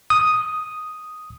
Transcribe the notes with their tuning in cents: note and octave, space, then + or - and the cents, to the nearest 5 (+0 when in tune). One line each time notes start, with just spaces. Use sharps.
D#6 +0